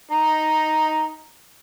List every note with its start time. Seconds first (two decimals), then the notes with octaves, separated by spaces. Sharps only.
0.11 D#4 A#5